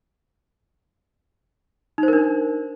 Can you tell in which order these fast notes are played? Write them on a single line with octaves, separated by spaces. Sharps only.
D#4 C5 A#4 D4